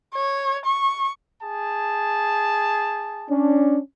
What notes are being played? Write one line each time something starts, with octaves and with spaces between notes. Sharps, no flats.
C#5
C#6
G#4 A5
C#4 D4